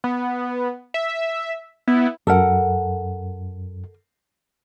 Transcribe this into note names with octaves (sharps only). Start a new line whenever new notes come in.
B3
E5
B3 E4
F#2 A4 A#4 F#5